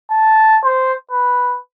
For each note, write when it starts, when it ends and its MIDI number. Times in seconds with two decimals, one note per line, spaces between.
0.11 0.59 81
0.65 0.94 72
1.11 1.58 71